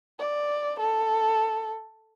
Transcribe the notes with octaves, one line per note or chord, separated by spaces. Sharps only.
D5
A4